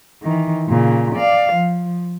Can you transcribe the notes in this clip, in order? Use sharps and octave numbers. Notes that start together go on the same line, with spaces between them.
D#3 E3
A#2 C#3
D5 F5
F3